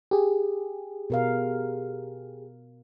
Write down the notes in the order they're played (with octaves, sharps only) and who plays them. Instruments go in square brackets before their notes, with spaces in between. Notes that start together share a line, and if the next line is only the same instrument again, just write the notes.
[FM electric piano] G4 G#4
[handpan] B2 A#4 F5